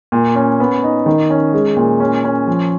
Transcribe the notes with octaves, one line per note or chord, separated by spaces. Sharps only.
A#2
C#4
B3
D#4
D#3
C#4
G#3
A#2
C#4
C#4
F3